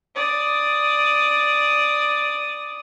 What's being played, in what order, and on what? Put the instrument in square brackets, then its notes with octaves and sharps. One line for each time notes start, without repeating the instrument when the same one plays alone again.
[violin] D5 D#6